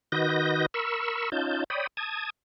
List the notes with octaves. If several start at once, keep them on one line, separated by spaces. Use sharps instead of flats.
D#3 F#4 B4 D#5 G6 A#6
A#4 B5 C#6 E6
C#4 D#4 F4 A5 G6
C#5 D5 G5 B5 D#6
A5 D#6 G#6